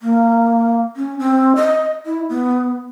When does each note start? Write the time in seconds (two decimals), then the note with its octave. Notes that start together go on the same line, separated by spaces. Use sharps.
0.01 A#3
0.96 C#4
1.19 C4
1.56 D#5
2.06 E4
2.29 B3